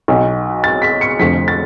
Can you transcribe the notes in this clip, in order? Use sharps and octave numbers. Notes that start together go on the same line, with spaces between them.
B1 B2
A6
B6
C#7
F1 F2 D3 F3 B6
A6